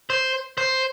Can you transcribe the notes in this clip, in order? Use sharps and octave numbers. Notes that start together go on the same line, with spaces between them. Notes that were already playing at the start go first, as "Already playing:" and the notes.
C5
C5